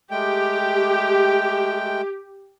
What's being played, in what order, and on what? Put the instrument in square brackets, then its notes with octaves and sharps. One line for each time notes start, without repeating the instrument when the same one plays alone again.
[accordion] G#3 A3 G5 [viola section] G4